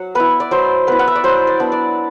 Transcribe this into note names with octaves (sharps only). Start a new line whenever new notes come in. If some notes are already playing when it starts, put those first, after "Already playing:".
Already playing: F#3 F#5
B3 E4 B4
D5
F#3 C5
B3 E4 B4
F#5
E5
D5
F#3 C5
D5
B3 D4
D5